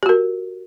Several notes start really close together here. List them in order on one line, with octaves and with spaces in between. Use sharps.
G4 F#4 A#4